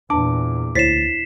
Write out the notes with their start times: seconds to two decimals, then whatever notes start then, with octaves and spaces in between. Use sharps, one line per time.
0.10 E2 A#2 D4 A5 D6
0.75 D2 E4 C5 C#5 A6 B6 C7 E7